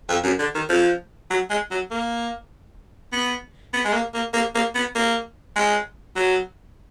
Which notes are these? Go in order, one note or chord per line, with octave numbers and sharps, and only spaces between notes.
F2
F#2
D3
D#3
F3
F#3
G#3
F#3
A#3
B3
B3
G#3
A#3
A#3
A#3
A#3
B3
A#3
G#3
F#3